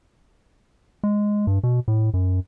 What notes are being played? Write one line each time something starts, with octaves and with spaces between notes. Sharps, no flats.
G#3
G2
B2
A2
F#2